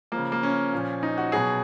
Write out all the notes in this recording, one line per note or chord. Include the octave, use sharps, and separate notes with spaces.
C#3 F3 A#3
A#3
C#4
A#2 F3
D#4
F#4
B2 F#3 G#4